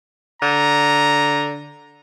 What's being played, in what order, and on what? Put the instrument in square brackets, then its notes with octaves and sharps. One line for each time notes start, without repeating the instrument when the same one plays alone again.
[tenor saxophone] D3 [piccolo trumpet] A#5